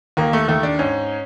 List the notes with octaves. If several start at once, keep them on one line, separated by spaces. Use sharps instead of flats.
D#2 A#3
A3
D#2 A3
D4
G#2 C#4